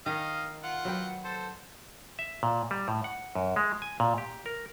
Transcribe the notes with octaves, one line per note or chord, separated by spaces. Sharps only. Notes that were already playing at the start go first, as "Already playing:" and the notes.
D#3 D#5 F5
F4 F#5
F#3 B4 G5
A4 C5
E5
A#2
G3
A2
F#5
F#2
G#3
G#5
A#2
G4
A#4